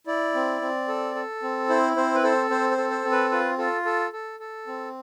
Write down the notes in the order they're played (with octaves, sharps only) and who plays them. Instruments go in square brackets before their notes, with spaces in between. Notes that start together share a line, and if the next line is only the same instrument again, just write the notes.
[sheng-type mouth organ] E4 D5
C4
C4
A4
A4
C4
E4 C5
C4 C5
B4
A4 C5
C4 C5
C5
A4
C5
C4
B4
F4 B4
F4 A4
A4
A4
A4
C4